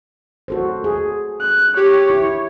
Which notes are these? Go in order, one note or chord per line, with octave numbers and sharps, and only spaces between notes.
F#4 A4 C5
G#4
F#6
G4 C#5
E4